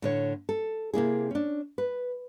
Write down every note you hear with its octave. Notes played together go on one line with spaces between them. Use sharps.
A2 D3 C#5
A4
C3 A#3 E4 G#4
C#4 D4
B4